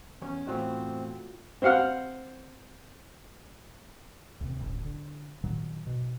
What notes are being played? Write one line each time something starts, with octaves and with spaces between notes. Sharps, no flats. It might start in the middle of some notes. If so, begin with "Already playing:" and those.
E2 C#4 C#5
E2 A2 A3 C4 F4 F#4 C5
C4 C5 F5 F#5 F6
D#2 C3
D#1 A1 D2
D3
A#2 D#3 F#3
B2